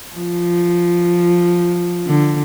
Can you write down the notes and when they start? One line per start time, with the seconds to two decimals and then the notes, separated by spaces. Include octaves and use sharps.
0.16 F3
2.06 D3